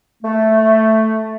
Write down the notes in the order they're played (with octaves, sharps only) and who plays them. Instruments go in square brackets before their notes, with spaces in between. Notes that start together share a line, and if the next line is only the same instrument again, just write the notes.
[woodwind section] A3